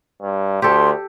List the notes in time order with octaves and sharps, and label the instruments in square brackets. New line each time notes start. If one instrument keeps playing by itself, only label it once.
[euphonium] G2
[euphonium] D2 [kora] G4 A4 [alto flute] C6